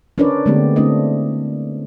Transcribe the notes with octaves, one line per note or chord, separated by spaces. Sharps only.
C#4 D4 A#4 B4 C#5 D5
D3 G#3 A3 B3 C4 G4
D3 A3 C4 D4 E4 D#5